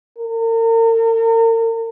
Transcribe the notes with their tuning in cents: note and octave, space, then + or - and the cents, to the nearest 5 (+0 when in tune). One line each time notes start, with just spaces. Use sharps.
A#4 -40